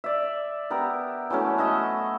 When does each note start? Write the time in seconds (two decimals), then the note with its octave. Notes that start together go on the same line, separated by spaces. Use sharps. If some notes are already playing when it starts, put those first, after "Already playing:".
0.04 D5 E5
0.70 B3 G4 A#4 A#5
1.30 E3 F#3 A3 C#4
1.58 F#4 D#5 E5 F#5